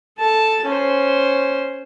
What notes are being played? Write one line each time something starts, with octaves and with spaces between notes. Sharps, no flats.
A4 A5
C#4 C5